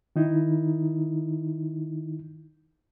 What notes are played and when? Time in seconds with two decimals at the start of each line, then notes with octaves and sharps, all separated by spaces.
0.16 D#3 D#4 E4